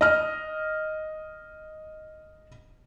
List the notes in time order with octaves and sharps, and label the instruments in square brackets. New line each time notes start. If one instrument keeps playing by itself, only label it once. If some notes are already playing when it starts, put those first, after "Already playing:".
[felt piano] D#5 F6